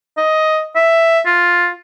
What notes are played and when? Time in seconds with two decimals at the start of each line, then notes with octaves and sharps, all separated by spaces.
0.17 D#5
0.76 E5
1.26 F4